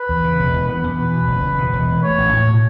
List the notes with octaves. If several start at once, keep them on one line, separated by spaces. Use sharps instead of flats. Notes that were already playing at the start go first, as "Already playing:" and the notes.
Already playing: B4
E2
C#3
E1
E2
B3 B4
E2
B2
B2
F#1
E2
B2
E1
E2
A3 C#5
A1
A2
B2